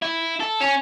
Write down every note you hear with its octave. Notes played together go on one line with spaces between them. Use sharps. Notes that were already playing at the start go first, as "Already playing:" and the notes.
E4
A4
C#4